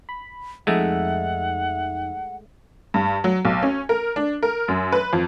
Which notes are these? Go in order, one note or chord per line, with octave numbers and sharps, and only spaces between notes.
B5
F2 G#3 A3 D#4 E5 F#5
G2
F#3
B1
C#4
A#4
D4
A#4
F#2
B4
F2